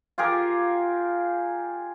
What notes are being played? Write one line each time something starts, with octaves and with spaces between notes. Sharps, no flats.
F4 G4 G#4 A#4